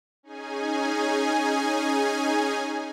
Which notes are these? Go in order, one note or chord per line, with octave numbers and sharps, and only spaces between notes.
C#4 D#4 G#4 G#5